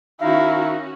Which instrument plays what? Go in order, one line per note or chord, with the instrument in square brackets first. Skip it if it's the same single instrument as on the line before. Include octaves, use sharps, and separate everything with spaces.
[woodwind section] D#3 D#4 [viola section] C#4 F#4 [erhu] E4 [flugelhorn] F5